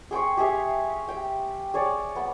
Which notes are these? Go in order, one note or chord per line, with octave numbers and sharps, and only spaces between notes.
G#4 G5 C6 C#6
G4 G#4 E5 F5
G5
G#4 C#5 D5
B3